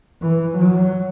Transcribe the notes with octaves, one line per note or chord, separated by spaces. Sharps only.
E3
F#3